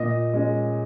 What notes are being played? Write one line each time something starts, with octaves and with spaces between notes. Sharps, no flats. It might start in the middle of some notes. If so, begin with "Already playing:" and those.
Already playing: A#2 D#5
G#3 C#4